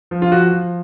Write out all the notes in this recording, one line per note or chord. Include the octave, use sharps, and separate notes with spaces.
F3
F4
F3 F#4
F3